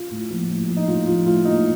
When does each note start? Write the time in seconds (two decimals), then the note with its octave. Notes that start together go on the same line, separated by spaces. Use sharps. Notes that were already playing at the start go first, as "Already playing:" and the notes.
Already playing: F4
0.11 A2
0.31 F3 A#3
0.49 A2
0.68 F3 A#3
0.77 D#4
0.88 A2 F4
1.07 F3 A#3 F4
1.26 A2 F4
1.45 F3 A#3 D#4